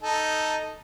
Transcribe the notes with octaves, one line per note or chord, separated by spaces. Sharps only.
D#4 A4